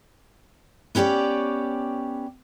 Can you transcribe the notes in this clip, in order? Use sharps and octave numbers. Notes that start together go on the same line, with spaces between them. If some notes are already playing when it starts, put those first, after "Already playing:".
B3 C#4 G4 C#5 D5